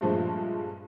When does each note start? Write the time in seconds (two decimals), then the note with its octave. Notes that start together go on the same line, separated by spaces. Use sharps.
0.01 G2 A#2 F3 G#3 A3